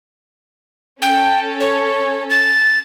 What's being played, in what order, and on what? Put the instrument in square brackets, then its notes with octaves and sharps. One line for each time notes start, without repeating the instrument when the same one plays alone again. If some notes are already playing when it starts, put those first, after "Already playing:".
[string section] C#4 A4 [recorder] G5
[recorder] C#5
A6